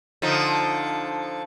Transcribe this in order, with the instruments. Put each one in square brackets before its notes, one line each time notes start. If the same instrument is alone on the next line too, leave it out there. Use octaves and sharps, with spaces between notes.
[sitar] D3 F3 D#4